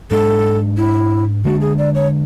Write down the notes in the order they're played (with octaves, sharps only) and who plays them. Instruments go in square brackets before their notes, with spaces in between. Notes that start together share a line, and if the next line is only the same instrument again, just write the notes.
[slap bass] G#2 G#3 D4 [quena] A4
[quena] E4
[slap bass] D3 G#3 B3 D4 [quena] F#4
[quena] G#4
D5
C#5